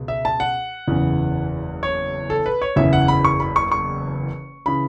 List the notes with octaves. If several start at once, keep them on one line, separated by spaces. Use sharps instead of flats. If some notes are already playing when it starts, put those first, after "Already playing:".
Already playing: C#2 B2
E5
A5
F#5
F#1 E2 C#3 E3
C#5
A4
B4
C#5
F#1 E2 C#3 E3 E5
F#5
B5
C#6
B5
C#6
C#6
C#3 E3 B5